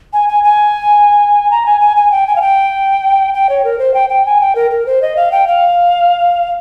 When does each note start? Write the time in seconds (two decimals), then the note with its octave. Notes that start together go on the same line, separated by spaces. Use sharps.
0.13 G#5
0.28 G#5
0.44 G#5
1.51 A#5
1.66 G#5
1.81 G#5
1.96 G#5
2.11 G5
2.27 G#5
2.36 F5
2.41 G5
3.34 G5
3.49 C#5
3.64 A#4
3.79 C5
3.94 G5
4.09 G5
4.26 G#5
4.41 G5
4.55 A#4
4.71 A#4
4.86 C5
5.02 D#5
5.16 F5
5.32 G5
5.47 F5